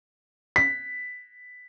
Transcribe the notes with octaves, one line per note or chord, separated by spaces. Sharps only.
B6